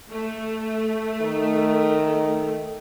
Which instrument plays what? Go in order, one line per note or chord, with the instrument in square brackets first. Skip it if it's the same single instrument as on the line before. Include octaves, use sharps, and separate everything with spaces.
[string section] A3
[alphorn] D#3